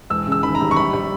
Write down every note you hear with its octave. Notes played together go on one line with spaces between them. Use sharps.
E1 E6
C#3
E6
D#2 B5
A#5
G3
C#6
A#1 B5
G3